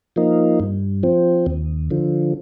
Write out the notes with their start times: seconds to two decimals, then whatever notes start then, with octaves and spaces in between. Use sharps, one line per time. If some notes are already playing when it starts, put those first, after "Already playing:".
0.16 F3 A#3 D#4
0.60 G2
1.03 F3 C4
1.46 D#2
1.91 D3 F3